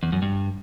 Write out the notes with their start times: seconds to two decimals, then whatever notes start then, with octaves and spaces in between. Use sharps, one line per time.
0.03 E2
0.12 F#2
0.22 G2